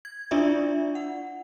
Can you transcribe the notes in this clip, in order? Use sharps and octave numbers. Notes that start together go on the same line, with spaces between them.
G#6
D4 E4 F4 D5 E5
F#5